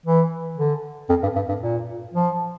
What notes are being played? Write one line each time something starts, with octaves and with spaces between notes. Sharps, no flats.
E3
D3
F2
G2
G2
G2
A#2
F3